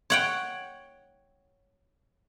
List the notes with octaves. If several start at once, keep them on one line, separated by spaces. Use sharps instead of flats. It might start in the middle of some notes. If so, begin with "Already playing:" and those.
C#5 F#5 G5